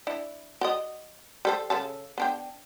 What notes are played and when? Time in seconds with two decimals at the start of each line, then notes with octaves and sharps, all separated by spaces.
0.07 D4 E4
0.61 F#4 D5 D#5
1.45 G3 A4 C5
1.70 C#3 A4 A5
2.18 B3 D4 G5